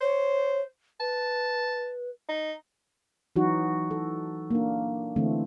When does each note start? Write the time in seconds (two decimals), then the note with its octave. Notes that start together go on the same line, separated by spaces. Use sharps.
0.01 C5 C#5
1.00 B4 A5
2.29 D#4
3.36 E3 F#3 D#4 F#4
3.91 A4
4.51 A#3 D4
5.16 D3 E3 A3 C4